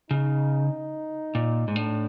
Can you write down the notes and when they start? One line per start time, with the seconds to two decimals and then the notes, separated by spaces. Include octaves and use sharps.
0.11 C#3 D#4
1.35 A#2
1.68 G#2
1.76 A2 D4